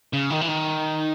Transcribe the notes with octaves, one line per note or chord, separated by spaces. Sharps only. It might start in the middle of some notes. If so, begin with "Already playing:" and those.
C#3
D#3
E3
D#3